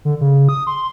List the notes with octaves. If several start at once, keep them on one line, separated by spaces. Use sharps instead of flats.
D3
C#3
D#6
C6